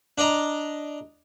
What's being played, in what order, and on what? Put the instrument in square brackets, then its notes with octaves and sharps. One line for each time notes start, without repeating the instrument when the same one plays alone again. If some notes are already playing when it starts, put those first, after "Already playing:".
[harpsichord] D4 D5 D#5 A#5